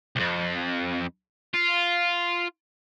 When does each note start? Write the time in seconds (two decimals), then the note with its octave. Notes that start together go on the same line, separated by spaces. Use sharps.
0.16 C2 F2
1.54 F4